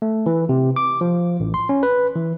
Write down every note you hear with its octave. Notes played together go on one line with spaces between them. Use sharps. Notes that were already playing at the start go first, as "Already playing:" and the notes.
A3
E3
C3
D6
F3
A1
C6
C#4
B4
E3